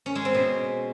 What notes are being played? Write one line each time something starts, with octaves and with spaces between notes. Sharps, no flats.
C#4
G#3
C4
B2